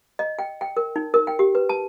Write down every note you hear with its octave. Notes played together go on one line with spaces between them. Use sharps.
D#5
G5
G5
A#4
D#4
A#4
G5
G4
B4
A5